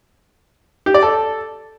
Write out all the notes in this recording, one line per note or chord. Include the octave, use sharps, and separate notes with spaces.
G4
D5
A4